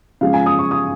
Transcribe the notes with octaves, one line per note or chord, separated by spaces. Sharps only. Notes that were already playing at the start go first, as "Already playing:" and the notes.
C#3 F3 G#3 F5
G#5
D#6
C#6
D#6